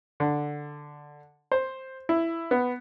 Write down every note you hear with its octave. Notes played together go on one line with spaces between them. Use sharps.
D3
C5
E4
B3